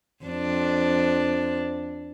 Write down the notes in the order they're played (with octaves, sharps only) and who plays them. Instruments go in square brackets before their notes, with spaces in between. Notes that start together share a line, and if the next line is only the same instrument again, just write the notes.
[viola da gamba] F2 D4